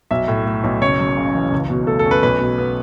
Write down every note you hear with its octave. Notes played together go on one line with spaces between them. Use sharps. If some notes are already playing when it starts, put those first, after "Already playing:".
B1 E5
A2
A3
B1
F#1 C#5
F#2
C#3
E3
C#2
B2
A3 A4
A4
C#4
B4
B1 B4
B2
B3